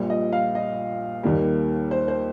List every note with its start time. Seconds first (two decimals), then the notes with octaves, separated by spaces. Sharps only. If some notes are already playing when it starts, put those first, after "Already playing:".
Already playing: A#1 A#2 G3
0.10 D#5
0.33 F5
0.55 D#5
1.23 D#2 D#3 G3 A#3
1.91 C5
2.08 C5